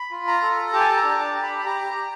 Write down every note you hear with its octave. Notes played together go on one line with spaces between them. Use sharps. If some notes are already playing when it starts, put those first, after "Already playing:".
Already playing: B5
F4
A#5
A4
G4 A5
G#5
A5
A#5
D4
A5
G4
B5
B5
G4 A#5
G4